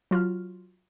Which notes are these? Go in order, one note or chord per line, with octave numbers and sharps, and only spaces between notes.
F#3 F4 F#4 F6